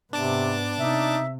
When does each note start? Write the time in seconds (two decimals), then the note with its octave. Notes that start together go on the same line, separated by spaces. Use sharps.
0.13 G#2 C3 B3 D4 A5 D6
0.80 C3 D#4 E5